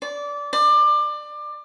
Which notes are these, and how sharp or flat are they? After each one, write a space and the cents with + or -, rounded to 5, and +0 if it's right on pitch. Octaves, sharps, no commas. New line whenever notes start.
D5 -20
D5 +25